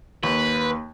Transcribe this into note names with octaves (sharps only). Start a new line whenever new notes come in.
D#2 B4